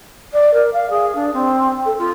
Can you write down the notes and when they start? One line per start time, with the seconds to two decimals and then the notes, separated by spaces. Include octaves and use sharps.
0.33 D5
0.53 A#4
0.73 F5
0.90 G#4
1.15 D4
1.33 C4
1.85 A4
1.98 F4